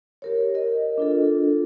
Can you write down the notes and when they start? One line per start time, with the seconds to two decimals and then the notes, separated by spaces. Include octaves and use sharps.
0.22 G4 A#4 C#5
0.55 A#4 D#5
0.98 D4 F4 A4